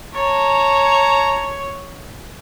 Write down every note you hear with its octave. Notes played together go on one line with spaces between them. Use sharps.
C#5 A5 A#5